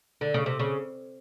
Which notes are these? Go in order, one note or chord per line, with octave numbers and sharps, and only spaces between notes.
D3
C#3
C3
C#3